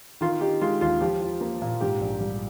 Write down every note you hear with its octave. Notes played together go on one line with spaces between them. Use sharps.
D#3 F4
D#4 G4
G#3 F4
D#2 F4
F3 G4
F4
A#3
A#2
G#2 G4
A#1
G3